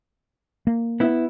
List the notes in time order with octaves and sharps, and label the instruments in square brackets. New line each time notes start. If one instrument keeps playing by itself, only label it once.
[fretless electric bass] A#3
[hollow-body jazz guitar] B3 E4